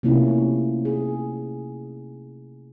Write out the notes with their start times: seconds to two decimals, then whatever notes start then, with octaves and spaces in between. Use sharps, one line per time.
0.03 C3 A3 A#3 C#4 E4 F4
0.85 G#4